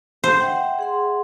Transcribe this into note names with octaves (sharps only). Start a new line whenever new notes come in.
C5
E5 F#5 G5
G#4 F#5 C6